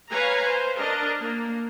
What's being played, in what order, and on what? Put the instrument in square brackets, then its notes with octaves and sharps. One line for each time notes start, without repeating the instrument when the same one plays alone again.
[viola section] B4 C#5 F5 G#5 A#5
C5
D4 A#4 D#5
A#3